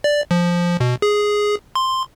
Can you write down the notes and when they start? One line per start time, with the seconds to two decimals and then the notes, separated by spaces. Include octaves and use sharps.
0.04 D5
0.31 F3
0.80 B2
1.02 G#4
1.75 C6